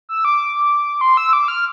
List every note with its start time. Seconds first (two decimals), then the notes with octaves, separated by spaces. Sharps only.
0.09 E6
0.25 D6
1.01 C6
1.17 E6
1.33 D6
1.48 F6